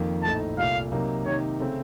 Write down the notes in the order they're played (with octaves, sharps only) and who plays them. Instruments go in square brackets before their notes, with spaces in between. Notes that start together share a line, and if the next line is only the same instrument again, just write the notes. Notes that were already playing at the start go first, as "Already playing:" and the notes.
Already playing: [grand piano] F2 D#3 A#3
[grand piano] A#1 A2 A3 D#4 [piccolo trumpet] A5
[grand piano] C2 A#2 A3 [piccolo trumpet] F5
[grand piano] C3 F#3 A#3 D#4 A#4
[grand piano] C3 D#3 A#3 D#4 [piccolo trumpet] C#5
[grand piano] C#3 A3 C4